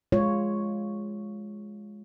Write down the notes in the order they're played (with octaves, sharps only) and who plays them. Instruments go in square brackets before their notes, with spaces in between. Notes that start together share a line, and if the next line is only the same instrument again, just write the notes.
[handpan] G#3 F4 C#5